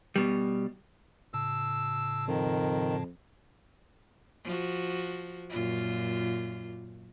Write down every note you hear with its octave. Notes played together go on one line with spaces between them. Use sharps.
B2 G3
A2 C#3 A5 E6
F2 D#3
F3 F#4
F#2 A#2 F4